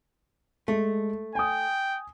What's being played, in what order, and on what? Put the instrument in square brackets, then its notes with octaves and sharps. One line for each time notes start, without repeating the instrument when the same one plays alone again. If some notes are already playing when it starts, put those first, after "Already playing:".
[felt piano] G#3 [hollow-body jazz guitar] A3
[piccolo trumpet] G5 [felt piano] G#5 D#6